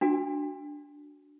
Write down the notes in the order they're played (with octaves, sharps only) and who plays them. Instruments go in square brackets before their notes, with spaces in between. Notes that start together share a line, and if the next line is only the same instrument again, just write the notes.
[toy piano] D4 F#4 G#5